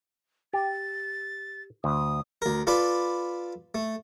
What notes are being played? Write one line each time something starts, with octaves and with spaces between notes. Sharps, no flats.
G4 A6
D2 D#6
D2 A#4
F4 A4 B4 D5 B5 D6
A3